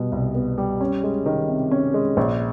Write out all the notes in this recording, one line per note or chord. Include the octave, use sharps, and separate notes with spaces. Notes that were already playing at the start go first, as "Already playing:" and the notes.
Already playing: B2 G3
C2
B3
G3
C#4
G#3
D#3
C3
C#4
G#3
A#1